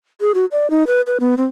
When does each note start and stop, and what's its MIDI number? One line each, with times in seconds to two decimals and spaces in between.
0.21 0.32 68
0.34 0.45 66
0.52 0.70 74
0.70 0.84 63
0.87 1.01 71
1.07 1.18 71
1.20 1.35 59
1.37 1.46 60